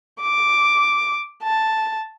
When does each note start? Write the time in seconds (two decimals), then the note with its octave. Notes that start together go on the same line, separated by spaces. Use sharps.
0.21 D6
1.43 A5